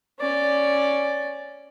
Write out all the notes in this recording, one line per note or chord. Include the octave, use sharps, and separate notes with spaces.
C#4 D5